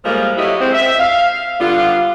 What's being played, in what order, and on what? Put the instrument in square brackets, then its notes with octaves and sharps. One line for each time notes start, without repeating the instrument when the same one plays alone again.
[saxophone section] A2 F3 G3 G#3 A#3
F#3 A3 E4 G4 D#5
G#3 C4
E5
F5
D3 G3 B3 F4